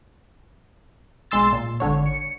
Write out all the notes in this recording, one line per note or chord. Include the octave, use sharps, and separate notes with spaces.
B1 G#3 C6 E6 A6
A#2
G#1 D3 C#5
C#7